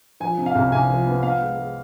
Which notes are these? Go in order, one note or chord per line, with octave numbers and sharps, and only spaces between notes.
F3 G#5
C3
F5
C2
C2 G#5
F3
B3
B3 F5
G#3
G#3